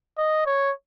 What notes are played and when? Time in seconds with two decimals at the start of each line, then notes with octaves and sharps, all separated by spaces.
0.18 D#5
0.46 C#5